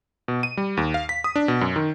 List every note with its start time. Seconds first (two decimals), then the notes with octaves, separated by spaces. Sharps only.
0.28 B2
0.43 D#7
0.57 G3
0.77 D#2
0.94 F5
1.09 B6
1.24 D#6
1.36 D4
1.48 B2
1.61 F#2
1.76 D#3